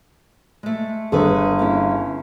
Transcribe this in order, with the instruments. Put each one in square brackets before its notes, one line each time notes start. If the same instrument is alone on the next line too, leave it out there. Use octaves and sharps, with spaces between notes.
[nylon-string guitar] G#3 A3
[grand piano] G1 [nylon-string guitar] G#4 A4 B4
[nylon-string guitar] C#4 E4 F5